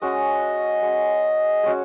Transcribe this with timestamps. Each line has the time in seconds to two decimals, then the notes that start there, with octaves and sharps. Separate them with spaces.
0.01 G#3 C#4 F#4 D#5
0.82 G#3 C#4 F#4
1.63 G#3 C#4 F#4